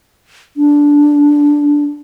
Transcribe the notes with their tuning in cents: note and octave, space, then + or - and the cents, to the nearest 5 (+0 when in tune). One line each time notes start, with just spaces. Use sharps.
D4 -10